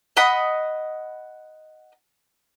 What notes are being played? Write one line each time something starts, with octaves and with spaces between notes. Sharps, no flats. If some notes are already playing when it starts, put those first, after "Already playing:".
D#5 F#5 B5 D#6